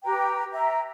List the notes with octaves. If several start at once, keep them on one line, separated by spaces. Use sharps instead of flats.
G4 B4 G5 A#5
E5 G5 A#5